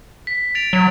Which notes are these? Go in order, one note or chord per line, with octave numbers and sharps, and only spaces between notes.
B6
A6 D7 F7
F#3